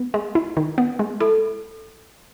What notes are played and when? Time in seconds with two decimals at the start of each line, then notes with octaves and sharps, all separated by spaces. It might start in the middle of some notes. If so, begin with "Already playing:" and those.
Already playing: B3
0.14 G#3
0.35 E4
0.57 D#3
0.78 B3
0.99 G#3
1.20 E4 A4